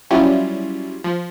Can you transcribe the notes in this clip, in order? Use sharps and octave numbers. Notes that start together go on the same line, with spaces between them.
F#3 G3 C#4 E4 F4
F3